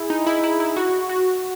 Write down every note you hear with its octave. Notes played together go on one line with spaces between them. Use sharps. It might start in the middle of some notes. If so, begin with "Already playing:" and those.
Already playing: E4 G#4
D#4
E4
E4
E4
F#4
F#4